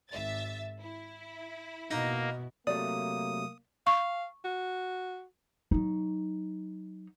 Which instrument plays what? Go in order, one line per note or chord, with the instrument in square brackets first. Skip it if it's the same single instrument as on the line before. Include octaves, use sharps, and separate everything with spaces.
[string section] G#1 E5 A6
E4
[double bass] B2 [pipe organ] A#3 [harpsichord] D#4
[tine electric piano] C3 F#3 A3 [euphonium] A#3 [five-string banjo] D5 [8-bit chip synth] D#6
[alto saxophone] F5 [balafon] C#6
[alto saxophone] F#4
[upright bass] F#3 D#4